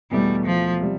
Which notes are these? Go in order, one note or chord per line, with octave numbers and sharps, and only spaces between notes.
E2 B2 G3 A3
F3
C3 G3